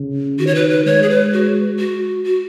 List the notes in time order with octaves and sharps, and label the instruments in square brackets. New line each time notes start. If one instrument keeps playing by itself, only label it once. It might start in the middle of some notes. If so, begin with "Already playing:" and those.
Already playing: [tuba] C#3
[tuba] D#3 [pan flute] F#4
[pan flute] C#5
B4
B4
[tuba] G#3 [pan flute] C#5
[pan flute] G#4
B4
F#4
F#4
F#4